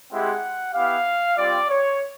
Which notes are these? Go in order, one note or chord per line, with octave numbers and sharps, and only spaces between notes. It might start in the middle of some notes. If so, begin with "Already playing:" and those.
G#3 C4 E4 G4 F#5
B3 E4 G4 F5
G3 C4 F4 D5
C#5